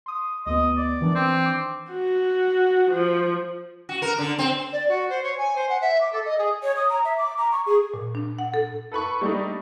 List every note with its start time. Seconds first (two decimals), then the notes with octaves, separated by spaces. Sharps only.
0.06 C6 D#6
0.46 D2 B3 D#5
0.77 D5
1.01 D#3 E3 D4
1.15 C4
1.46 D6
1.91 F#4
2.90 F3
3.89 F#4
4.02 A#4
4.18 D3
4.39 C4
4.72 D5
4.88 F#4
5.09 C5
5.23 C#5
5.37 G#5
5.56 C5
5.69 F#5
5.81 E5
6.00 D6
6.12 A4
6.25 D#5
6.38 G#4
6.63 C#5
6.77 D#6
6.89 A#5
7.05 E5
7.18 D6
7.38 A#5
7.52 C#6
7.66 G#4
7.94 A#2
8.15 D4
8.39 F#5
8.54 A4
8.92 A4 B4 B5 C#6
9.21 G3 A3 D4 D#4